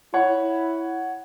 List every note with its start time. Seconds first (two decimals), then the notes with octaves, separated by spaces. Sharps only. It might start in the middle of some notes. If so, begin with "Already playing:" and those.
0.14 E4 C#5 F#5